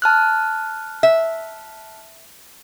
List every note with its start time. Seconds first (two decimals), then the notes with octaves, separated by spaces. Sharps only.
0.02 A5 F6 F#6
1.03 E5